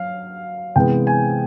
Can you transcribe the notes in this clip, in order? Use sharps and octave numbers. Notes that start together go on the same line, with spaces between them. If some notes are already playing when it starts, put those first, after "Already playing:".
Already playing: F#3 F5
C3 E3 G#3 B3 G5
G#5